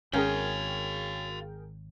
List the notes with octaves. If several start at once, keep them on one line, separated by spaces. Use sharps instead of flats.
G#1 C#4 F#4 G#4 A#4 F5 G5